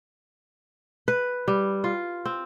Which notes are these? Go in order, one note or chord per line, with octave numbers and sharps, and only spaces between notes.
B4
G3
F4
C4